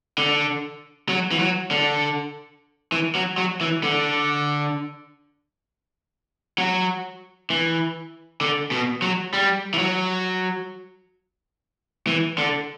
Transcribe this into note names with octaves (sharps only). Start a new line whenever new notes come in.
D3
F#3
E3
F#3
D3
E3
F#3
F#3
E3
D3
F#3
E3
D3
B2
F#3
G3
E3
F#3
E3
D3